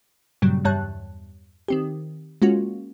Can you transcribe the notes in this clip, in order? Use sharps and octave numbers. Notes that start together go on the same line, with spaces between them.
G2 A#2 C#3 F#3 G3
E2 G2 G3 C#5 A5 F#6
D#3 C4 G4
G#3 A#3 C#4 F4 F#4